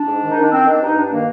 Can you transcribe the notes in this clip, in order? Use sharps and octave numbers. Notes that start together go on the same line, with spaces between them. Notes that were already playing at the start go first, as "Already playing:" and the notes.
Already playing: D4
G#2
D#3
D#4
D#3 D4
D#3 C4
D#3 D4
G2 D#4
G2 D4
D#3 A#3